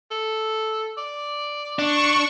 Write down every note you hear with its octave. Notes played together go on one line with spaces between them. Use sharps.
A4
D5
D4 C#6